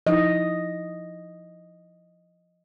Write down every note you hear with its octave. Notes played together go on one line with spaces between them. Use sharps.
F3 D#4 E4 D#5